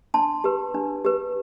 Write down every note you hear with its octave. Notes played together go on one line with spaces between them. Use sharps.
D4 A5 C6
G4 B4
D4
G4 B4